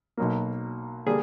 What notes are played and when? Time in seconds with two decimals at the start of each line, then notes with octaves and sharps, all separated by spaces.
0.17 B1 B2 F#3 A#3
1.06 D3 G3 A#3 D4 G#4